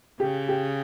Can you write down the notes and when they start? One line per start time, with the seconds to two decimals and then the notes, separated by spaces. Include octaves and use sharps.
0.20 C#3 G4
0.48 G4